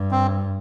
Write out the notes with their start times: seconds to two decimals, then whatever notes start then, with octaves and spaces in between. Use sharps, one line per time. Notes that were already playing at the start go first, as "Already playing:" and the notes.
Already playing: G2
0.11 C4